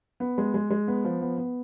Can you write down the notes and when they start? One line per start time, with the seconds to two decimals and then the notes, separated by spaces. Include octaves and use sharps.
0.20 B3
0.38 G#3
0.54 G#3
0.70 G#3
0.88 B3
1.05 F3
1.22 B3
1.38 B3